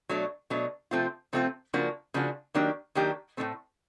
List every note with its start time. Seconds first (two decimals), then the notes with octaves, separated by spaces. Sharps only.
0.09 B2 F#3 A3 D4
0.50 B2 F#3 A3 D4
0.91 C3 F3 A3 C4 F4
1.33 C3 F3 A3 C4 F4
1.73 C#3 F3 A#3 D4 F#4
2.14 C#3 F3 A#3 D4 F#4
2.54 D#3 F#3 A#3 D4 G4
2.95 D#3 F#3 A#3 D4 G4
3.37 A2 E3 A3 C4